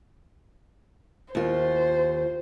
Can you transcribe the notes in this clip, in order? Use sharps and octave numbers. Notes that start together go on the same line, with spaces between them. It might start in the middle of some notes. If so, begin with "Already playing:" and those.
D#2 F4 C5